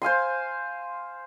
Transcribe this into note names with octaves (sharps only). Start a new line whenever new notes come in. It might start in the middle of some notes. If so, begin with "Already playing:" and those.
C5 F5 G#5 C6